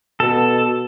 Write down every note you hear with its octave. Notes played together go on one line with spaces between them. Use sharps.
B2 A4